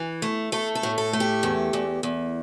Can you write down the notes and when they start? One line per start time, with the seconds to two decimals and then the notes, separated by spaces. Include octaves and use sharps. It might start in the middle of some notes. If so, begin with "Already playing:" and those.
Already playing: E3
0.22 A3
0.52 A3 A4
0.75 A4
0.83 A2
0.98 A4
1.13 A3
1.20 G4
1.43 E2
1.73 E2
2.03 E2